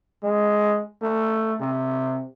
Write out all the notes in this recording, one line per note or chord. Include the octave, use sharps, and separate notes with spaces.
G#3
A3
C3